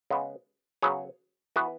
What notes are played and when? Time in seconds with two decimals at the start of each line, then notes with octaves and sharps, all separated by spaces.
0.11 C#3 G#3 B3
0.83 C#3 F#3 B3 G#4 C#5
1.56 E3 B3 F#4 B4